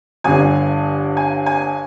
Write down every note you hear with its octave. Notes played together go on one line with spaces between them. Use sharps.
G1 G2 D3 G#5
G#5
G#5